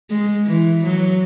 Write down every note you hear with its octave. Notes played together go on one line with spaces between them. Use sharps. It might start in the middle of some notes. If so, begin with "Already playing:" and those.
G#3
E3
F#3